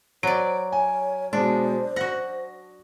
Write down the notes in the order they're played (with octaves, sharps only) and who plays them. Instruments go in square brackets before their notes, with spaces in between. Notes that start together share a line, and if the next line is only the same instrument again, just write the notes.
[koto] F#3 D5 [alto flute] C5 [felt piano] D7
[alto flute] C#5 [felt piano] G#5
[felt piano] B2 G#3 [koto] D4 [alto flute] C5
[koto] F#4 F#5 [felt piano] A#6